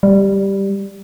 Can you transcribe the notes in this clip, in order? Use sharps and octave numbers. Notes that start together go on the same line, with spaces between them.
G3